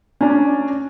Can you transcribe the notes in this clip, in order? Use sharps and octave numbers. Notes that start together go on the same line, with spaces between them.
C#4 D4